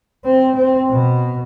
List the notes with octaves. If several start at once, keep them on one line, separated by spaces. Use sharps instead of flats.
C4
C4
B2